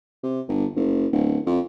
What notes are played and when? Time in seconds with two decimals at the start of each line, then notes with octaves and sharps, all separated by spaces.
0.23 C3
0.48 G1
0.76 F#1
1.13 D1
1.46 F2